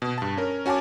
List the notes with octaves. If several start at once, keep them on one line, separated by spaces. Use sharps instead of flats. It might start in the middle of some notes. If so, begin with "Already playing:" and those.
B2
G2 A5
C#4 A#4
C#4 F#4 G#5 A5 D6